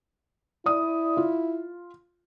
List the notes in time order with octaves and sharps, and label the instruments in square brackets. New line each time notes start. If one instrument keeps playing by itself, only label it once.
[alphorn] E4 [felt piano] D5 D#6
[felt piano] F4